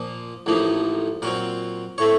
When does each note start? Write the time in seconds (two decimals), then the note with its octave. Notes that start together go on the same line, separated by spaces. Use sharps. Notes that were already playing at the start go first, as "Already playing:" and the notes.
Already playing: A#2 F3 A#3
0.46 A1 A2 F3 A#3 D#4
1.22 A#2 F#3 C4 A#4
1.98 A2 A3 C4 C#5